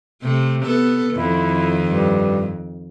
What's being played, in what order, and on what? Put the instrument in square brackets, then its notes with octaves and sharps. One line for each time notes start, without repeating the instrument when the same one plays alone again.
[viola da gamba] C3 A3
B3 A4
[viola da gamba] F2 D#3 [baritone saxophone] E4
[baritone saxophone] G2